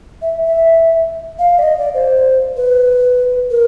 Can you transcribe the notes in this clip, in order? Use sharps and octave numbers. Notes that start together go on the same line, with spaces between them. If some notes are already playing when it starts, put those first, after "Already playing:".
E5
E5
F5
D5
D#5
D5
C5
B4
A#4